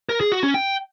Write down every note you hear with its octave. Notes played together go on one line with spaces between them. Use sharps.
A#4
G#4
F#4
C#4
G5